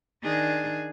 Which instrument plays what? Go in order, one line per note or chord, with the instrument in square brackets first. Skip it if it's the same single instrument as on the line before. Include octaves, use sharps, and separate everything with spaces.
[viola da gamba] D#3 D4 G#4